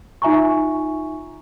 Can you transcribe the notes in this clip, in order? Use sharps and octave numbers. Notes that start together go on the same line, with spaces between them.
D#4 F4 E5 G#5 A#5 C#6